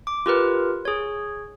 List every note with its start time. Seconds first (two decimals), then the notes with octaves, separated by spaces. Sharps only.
0.07 D6
0.26 F4 G4 A#4 B4
0.85 G#4 C#5